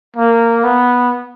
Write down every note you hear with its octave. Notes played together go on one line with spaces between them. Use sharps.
A#3
B3